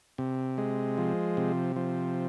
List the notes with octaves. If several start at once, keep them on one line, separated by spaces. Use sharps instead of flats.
C3
G#3
F3
C3
F3